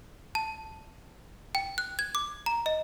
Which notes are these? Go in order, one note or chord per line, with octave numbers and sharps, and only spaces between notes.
A5
G5
F#6
G#6
D6
A#5
D#5